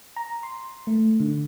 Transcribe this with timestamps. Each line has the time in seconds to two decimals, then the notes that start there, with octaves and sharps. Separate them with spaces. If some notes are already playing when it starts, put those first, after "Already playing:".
0.16 A#5
0.43 C6
0.87 A3
1.20 D3